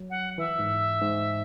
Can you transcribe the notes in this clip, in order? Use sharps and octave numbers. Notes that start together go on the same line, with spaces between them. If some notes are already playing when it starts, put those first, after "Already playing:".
Already playing: F#3
F#5
E3 E5
G#2
G#2